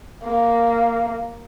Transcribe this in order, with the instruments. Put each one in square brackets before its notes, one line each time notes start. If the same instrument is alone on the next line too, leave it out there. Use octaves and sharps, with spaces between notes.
[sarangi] A#3